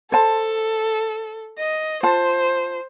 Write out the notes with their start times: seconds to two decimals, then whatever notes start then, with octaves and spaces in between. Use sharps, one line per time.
0.12 A4 C5 A5
1.59 D#5
2.03 F4 C5 A5